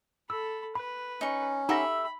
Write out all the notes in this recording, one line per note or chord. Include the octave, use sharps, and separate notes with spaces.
A4 B5 E6
B4 B5
C#4 D#4 C#6
D#4 G4 A4 E5 F#5 B5 A#6